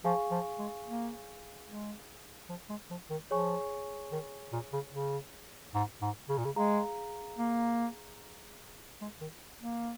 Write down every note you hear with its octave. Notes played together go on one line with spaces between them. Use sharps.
F3 G#4 F5 G#5 C#6
F3
G#3
A#3
G#3
F3
G#3
F3
D#3
F3 G#4 C#5 G#5 C#6
D#3
A#2
C#3
C#3
G#2
G#2
C#3
A#2
C#3
G#3 G#4 F5 A#5
A#3
G#3
D#3
A#3